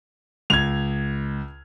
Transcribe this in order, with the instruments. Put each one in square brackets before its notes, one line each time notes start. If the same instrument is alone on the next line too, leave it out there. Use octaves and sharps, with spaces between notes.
[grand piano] C#2 [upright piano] G#6 F7